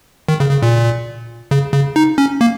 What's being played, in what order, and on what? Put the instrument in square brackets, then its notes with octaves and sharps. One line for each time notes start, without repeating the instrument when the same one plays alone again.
[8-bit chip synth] D#3
C#3
C#3
A#2
C#3
C#3
D#4
C#4
A#3